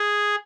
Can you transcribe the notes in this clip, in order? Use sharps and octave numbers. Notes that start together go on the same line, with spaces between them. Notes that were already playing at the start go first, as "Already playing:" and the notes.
Already playing: G#4